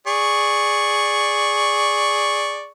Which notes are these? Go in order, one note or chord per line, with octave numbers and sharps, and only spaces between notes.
G#4 D5 C#6